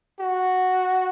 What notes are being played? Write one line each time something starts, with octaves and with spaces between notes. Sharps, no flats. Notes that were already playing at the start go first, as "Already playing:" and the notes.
F#4